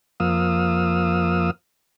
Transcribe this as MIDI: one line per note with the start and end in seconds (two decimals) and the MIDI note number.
0.20 1.51 41
0.20 1.51 53
0.20 1.51 58
0.20 1.51 77
0.20 1.51 87
0.20 1.51 88